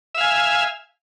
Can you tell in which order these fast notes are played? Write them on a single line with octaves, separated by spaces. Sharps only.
E5 F5 G#5